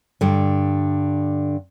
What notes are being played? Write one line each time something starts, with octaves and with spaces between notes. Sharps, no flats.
G2 D3